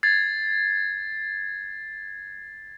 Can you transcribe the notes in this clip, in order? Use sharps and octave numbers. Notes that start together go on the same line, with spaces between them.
G#6 A6 C7